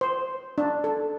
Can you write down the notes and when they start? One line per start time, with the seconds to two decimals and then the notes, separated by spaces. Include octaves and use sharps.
0.01 C5
0.58 D4
0.84 A4